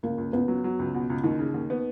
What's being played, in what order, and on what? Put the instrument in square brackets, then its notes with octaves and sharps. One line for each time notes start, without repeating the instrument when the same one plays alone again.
[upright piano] C#2 [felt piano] A#3
[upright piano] C#2
[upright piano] C#2 [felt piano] B3
[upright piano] F#3
F#3
C#2
B2
C#2
[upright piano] D#2 [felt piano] D#4
[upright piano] C#3
D#2
B3